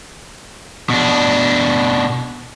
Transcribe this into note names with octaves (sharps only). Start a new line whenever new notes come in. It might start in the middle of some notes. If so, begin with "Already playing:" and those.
B2 D4